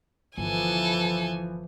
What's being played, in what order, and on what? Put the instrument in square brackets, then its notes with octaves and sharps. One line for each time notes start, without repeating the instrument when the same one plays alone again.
[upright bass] G1 [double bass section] E3 F3 [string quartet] A4 G#5